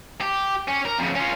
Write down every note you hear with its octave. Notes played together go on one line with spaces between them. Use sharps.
G4
C#4
A#4
F2 C#3
C#4 F4